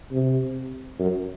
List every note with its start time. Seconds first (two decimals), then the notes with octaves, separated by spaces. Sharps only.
0.11 C3
0.99 F#2